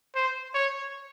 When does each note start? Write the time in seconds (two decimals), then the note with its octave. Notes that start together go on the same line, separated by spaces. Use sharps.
0.15 C5
0.54 C#5